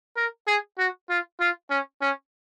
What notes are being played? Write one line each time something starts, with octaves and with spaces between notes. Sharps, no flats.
A#4
G#4
F#4
F4
F4
C#4
C#4